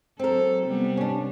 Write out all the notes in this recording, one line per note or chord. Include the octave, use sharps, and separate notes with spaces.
F#3 C4 A4 A#4
C3 G3 B3
C#4 D4